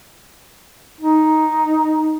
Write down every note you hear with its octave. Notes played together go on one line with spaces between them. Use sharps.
D#4